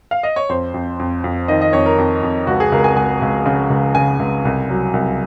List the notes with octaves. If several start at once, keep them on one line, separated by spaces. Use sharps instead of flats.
F5
D#5
C#5
F2 C5
F2
F2
F2
D#3 D#5
D#5
F2 C#5
A#4
F2
F2
C#2 F#4
G#4
C#2 A#4
G#5
C#2 G#5
C#2
C#3
C#2
C#3 G#5
C#2
C2
F#3
C2